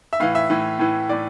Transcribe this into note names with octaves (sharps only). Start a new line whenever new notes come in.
E5
A2 E3 F5
E5
A2 E3
A2 E3
A2 E3 D5